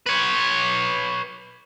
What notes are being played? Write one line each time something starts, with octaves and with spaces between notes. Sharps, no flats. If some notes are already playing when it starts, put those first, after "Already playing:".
B4 C#5